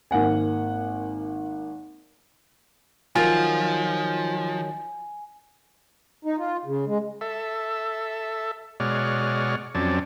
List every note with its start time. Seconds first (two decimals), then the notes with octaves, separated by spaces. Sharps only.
0.11 G#1 A#3 F#5 G#5
3.15 D#3 F3 F#3 F4 G#5
6.25 D#4
6.38 F4
6.66 C#3
6.87 G#3
7.21 A4 E5
8.80 B2 G#3 C#5 D5 F#5 F6
9.75 F2 F#3 C4 C#4 D5 A5